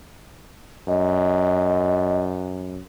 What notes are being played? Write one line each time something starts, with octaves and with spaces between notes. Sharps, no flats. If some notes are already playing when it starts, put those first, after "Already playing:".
F#2 D#5